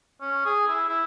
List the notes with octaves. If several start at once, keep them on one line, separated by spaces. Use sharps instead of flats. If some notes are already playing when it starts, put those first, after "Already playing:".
C#4
G#4
E4
E4